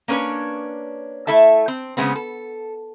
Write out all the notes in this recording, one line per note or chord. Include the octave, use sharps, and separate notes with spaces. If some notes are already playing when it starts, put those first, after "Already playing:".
A#3 C#4 D4 B4 C#5
A3 E4 A4 E5 A5
C4
C#3 F#3 G#3 B3 C4
A4